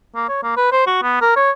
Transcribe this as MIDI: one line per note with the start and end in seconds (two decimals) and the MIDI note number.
0.15 0.27 58
0.29 0.40 73
0.43 0.57 58
0.57 0.70 71
0.72 0.86 72
0.87 1.01 66
1.02 1.17 59
1.21 1.34 70
1.36 1.51 73